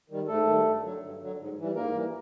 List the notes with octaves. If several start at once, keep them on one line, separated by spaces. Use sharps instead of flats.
D#3 G3
G#2 A3 A4
D#3 G3
G2
D3 F#3
G2
D3 F#3
G#2
E3 G3
G#2 A#3 A#4
E3 G3